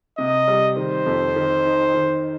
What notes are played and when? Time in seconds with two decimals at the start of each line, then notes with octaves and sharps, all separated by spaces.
0.18 C3 D#5
0.48 G3
0.77 D#3 C5
1.06 F2
1.36 D#3
1.65 D#4
1.94 D#3